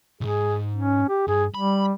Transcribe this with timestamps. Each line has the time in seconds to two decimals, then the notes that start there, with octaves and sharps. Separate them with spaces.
0.21 B1 G#2 G#4
0.76 C#4
1.09 G4
1.28 G2 G#4
1.54 G3 B5